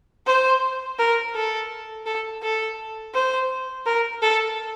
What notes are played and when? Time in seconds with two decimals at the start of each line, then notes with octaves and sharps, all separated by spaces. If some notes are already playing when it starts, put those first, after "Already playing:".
0.27 C5
0.99 A#4
1.35 A4
2.06 A4
2.42 A4
3.14 C5
3.86 A#4
4.22 A4